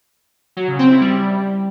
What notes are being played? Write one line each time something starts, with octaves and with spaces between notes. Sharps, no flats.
F#3
C#3
C4
E4
G3